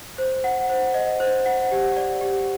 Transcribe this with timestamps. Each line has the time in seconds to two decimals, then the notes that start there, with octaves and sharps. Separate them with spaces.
0.18 C5
0.44 F#5
0.69 C5
0.94 D#5
1.20 C5
1.46 F#5
1.72 G4
1.96 D5
2.21 G4